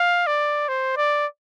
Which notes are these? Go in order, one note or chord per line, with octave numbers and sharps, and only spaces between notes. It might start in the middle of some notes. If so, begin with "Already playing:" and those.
Already playing: F5
D5
C5
D5